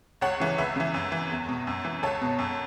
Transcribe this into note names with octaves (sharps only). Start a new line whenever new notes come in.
C#2 C#5 F#5
C#3 E3
C#2 B4 E5
C#3 E3
F#2
E3
E2
B2
F#2
E3
C#2 A4 C#5
B2
F#2